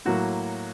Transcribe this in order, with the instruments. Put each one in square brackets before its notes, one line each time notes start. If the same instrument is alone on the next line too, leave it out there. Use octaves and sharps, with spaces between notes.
[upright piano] A2 F#3 A#3 F#4